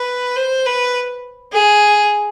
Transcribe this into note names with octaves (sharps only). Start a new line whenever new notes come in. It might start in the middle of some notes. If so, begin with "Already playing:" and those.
Already playing: B4
C5
B4
G#4